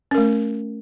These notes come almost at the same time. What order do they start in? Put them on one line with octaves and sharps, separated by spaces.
C#4 A#4 A3